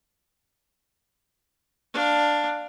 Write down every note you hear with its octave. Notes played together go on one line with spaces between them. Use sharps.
D4 F5